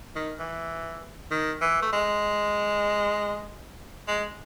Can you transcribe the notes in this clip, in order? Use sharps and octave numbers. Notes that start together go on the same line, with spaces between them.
D#3
E3
D#3
E3
A3
G#3
G#3